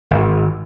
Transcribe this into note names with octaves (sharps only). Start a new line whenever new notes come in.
G#1